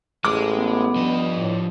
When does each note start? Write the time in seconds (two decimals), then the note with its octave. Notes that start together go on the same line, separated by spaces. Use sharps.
0.25 A1 G#3 D6
0.57 B3
0.96 G2 F3 D#5
1.36 A2